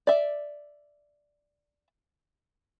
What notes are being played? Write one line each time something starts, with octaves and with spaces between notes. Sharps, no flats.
D5 E5